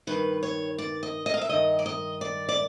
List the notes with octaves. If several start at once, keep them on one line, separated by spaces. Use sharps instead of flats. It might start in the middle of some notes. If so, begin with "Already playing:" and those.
G2 D#3 B4
C#5
D5
D#5
D#5
F5
E5
G2 D#3 D#5
D5
D#5
D5
D5